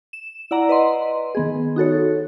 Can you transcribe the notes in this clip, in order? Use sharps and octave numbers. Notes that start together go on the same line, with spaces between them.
E7
E4 D5 F#5 A#5
B4 D#5 C6
D#3 B3 G#4
D#4 F#4 A4 C#5